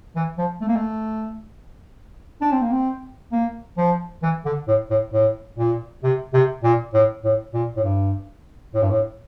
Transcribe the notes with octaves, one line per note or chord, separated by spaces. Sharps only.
E3
F3
A3
A#3
A3
D4
C4
A#3
C4
A#3
F3
E3
D3
A2
A2
A2
A#2
C3
C3
A#2
A2
A2
A#2
A2
G2
A2
G2
A2